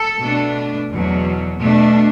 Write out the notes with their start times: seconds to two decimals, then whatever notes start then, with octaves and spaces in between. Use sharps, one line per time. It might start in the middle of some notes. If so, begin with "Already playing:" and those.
Already playing: A4
0.22 B2 A3 D4
0.91 E2 B2 F#3
1.60 B2 A3 D4